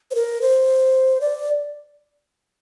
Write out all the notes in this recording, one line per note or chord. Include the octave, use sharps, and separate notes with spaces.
C5
A#4
C5
D5